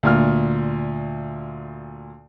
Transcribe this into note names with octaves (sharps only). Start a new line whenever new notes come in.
D2 A#2 F6